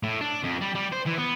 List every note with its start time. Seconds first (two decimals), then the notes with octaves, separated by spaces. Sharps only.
0.03 A2
0.21 D4
0.44 F2
0.61 G3
0.75 G3
0.92 C5
1.06 E3
1.18 B3